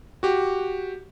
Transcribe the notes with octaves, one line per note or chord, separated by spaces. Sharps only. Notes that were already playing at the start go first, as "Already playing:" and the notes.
F#4 G4